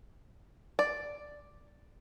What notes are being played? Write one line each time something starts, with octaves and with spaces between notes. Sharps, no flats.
D5